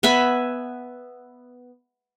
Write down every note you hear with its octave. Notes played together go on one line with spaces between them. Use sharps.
B3 E5 G#5 B5